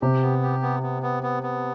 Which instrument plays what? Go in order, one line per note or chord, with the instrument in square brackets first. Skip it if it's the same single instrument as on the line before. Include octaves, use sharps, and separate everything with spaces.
[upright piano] C3 [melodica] G4
[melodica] B3
G4
B3
B3
B3
B3
B3